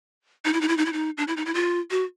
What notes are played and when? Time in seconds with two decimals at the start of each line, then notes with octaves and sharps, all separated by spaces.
0.45 D#4
0.53 E4
0.61 D#4
0.68 E4
0.77 D#4
0.86 E4
0.93 D#4
1.17 D4
1.28 E4
1.37 D#4
1.46 E4
1.54 F4
1.91 F#4